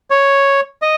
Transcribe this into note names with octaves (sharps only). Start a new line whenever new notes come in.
C#5
D#5